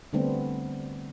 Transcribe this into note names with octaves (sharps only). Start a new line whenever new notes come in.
D3 G3 A3 B3 C4 D4